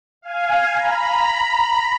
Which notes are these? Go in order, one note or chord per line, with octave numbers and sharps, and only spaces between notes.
F5 G#5
A#5 B5